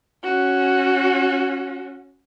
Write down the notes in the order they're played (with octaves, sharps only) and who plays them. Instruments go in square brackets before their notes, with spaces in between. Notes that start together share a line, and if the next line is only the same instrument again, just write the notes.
[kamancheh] C#4 F#4